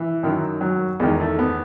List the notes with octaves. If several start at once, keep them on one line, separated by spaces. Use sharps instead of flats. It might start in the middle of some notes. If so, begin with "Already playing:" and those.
Already playing: E3
F#2 D#3
F#3
E2 D#3 G#3
A3
B3